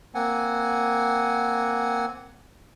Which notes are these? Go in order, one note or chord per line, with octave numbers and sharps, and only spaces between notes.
A#3 C4 F#5 G#5